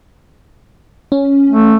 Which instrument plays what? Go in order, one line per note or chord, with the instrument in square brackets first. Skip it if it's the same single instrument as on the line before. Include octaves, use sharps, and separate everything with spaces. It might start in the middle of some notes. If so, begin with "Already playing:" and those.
[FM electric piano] C#4
[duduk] A3